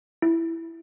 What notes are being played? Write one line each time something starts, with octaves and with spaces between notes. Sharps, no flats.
E4